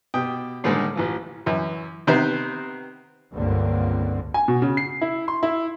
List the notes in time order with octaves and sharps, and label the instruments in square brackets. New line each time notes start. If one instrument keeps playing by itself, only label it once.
[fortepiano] B2 G4 G5 D#6
A2 D3 D#3 G3 G#3 A#3
A1 E3 F3
F#2 E3
C3 D#3 B3 C4 B4 C5
[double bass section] C#2 G2 D3 A#3 C4
[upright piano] G#5
B2
C#3
C7
E4
C6
E4